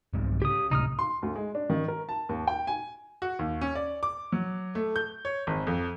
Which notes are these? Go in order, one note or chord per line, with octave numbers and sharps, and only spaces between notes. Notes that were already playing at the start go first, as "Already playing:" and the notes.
C2 G#2 C3
C#3 G4 D#6
C#2 A2 C3 D#4 D#6 F6
C6
D2
G#3
D4
D#3
A#4
A5
D#2
G5
G#5
F#4
D#2
C#4
D5
D6
F#3
A3
G6
C#5
G#1
F2